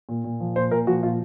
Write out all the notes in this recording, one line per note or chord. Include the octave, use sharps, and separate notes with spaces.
A#2
A#2
F3
A#2 C5
A#2 A#4
F3 F#4
A#2 F4